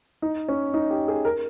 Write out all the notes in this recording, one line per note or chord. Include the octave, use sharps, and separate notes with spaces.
D#4
C#4
D#4
G4
G#4
A#4